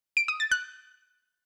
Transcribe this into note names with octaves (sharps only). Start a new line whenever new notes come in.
D7
D#6
A6
F#6